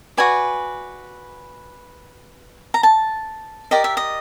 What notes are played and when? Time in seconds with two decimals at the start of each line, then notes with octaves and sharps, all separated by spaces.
0.17 F#4 B4 D5 G#5
2.74 A#5
2.83 A5
3.71 G4 A#4 D5 D#5
3.84 E5
3.97 D#5